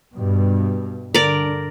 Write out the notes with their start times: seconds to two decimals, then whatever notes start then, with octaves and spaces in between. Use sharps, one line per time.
0.15 G2 B2
1.14 D3 A#4 D5